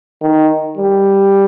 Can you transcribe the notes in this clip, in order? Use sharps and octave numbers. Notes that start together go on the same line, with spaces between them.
D#3
G3